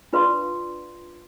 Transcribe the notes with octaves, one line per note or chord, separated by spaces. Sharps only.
D4 F4 B4 D5 F5 C6